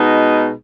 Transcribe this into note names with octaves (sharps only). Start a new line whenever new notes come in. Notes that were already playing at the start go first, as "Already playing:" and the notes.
Already playing: B2 G#3 B3 D#4